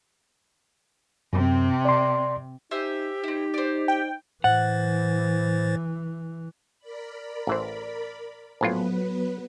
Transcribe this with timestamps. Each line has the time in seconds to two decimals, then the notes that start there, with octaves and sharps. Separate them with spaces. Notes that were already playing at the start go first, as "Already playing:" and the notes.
1.33 F#2 C3 C4
1.85 D5 C6
2.71 D#4 G4 C5 E5 G#5
3.24 C4 D#4 E4
3.54 C5 D5
3.88 G5
4.44 A2 E3 C5 F#5 A6
6.79 A#4 D5 B5
7.47 A1 E3 C5
8.61 A#1 A2 F#3 B3 F4 B4